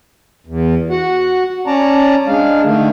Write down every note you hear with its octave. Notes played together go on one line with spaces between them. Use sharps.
E2
F#4 F#5
C#4 D5 A5 A#5
G#3 D4 F5
D3 D#3 A3